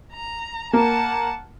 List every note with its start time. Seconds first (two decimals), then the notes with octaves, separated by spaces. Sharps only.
0.13 A#5
0.73 A#3 F#5 A5